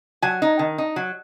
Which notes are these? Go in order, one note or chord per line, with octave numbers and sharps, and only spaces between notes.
F#3 G#5
D#4
D#3
D#4
F#3